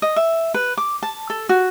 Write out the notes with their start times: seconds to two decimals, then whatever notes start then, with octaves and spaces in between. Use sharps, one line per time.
0.02 D#5
0.16 E5
0.54 B4
0.77 D6
1.03 A5
1.30 A4
1.49 F#4